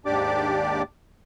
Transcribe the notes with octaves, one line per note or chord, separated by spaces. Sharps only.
D#2 G#2 D4 G4 D5 D6